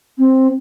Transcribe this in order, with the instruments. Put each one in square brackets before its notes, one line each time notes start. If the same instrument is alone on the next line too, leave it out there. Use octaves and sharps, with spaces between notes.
[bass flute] C4